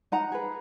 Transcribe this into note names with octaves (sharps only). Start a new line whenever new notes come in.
D#4 F#5 A#5
G#4 B4